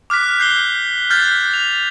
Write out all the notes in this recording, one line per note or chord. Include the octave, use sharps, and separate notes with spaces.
D6 F6 F#6 B6
F#6 G6 C7 G7
F6 G6 A6 B6 C7
F7